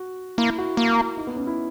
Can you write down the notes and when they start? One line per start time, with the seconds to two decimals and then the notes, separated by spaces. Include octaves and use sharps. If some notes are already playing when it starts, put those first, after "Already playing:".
Already playing: F#4
0.38 A#3 E4
0.58 F#4
0.77 A#3
1.17 D#4
1.27 B3
1.36 C#4
1.47 E4